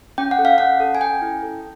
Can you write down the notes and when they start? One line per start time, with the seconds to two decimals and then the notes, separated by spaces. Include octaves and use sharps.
0.18 C#4 G5
0.31 F#5
0.39 A4
0.45 F5
0.58 C#4 F#5
0.80 A4
0.95 G#5
1.01 C#4 G5
1.22 E4
1.43 A4